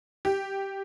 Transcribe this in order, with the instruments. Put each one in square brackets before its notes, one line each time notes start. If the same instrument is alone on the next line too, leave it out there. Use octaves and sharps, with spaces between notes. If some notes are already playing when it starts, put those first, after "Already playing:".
[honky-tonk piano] G4